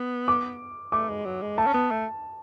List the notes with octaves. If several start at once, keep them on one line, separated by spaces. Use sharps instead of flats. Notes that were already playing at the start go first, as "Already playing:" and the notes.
Already playing: B3
D6
A3 D6
G#3
F#3
G#3
A3 A5
C#4
B3
A3